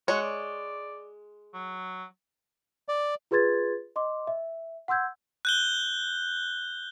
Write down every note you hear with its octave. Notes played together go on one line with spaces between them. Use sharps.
G#3 F#4 C#5
D5
F#3
D5
F4 G#4 B4 C6 G#6 A6
D#5 C6 D6
E5
F#5 C6 E6 G6 G#6
F#6 G6 G7